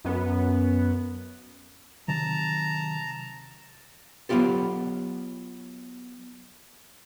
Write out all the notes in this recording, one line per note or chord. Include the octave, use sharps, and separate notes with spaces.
F#2 B3
C3 D#3 F#3 A5 A#5
F#3 B3 C4 F4 G4 A4